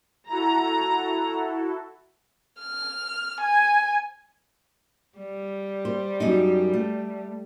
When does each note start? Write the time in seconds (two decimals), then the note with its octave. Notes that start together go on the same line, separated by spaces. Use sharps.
0.29 E4 F#4 A4 A#5
2.61 F6
3.41 G#5
5.18 G3
5.85 C5
6.20 F#2 D#4
6.73 A3